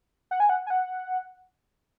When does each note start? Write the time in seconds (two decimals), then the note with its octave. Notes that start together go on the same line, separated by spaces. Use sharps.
0.31 F#5
0.40 G#5
0.49 F#5
0.67 G#5
0.70 F#5